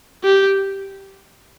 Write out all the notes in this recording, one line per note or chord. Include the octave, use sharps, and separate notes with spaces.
G4